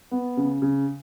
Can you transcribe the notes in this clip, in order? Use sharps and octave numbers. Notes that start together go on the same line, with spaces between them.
B3
C#3
C#3